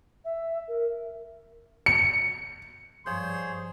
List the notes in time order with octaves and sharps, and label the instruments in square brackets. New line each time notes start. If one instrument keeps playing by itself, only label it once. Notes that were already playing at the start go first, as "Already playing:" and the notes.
[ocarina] E5
A#4
[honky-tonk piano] C#7
[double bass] G2 [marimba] F3 G6 [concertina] G#4 C5 C#5 [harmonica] C6